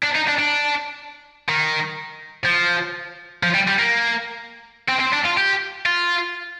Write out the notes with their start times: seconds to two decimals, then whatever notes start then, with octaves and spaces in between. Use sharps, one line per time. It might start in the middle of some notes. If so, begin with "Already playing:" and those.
0.03 D4
0.15 D#4
0.28 D4
0.39 D4
1.49 D#3
2.45 F3
3.43 F3
3.54 G3
3.68 G3
3.79 A#3
4.89 C4
5.00 C4
5.13 D4
5.26 F4
5.38 G4
5.86 F4